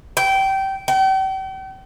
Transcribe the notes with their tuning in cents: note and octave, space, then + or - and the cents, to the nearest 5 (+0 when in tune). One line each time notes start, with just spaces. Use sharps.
G5 -20
G5 -40